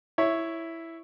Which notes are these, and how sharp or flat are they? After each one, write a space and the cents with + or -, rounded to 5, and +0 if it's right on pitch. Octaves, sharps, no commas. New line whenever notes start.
E4 +0 C#5 +0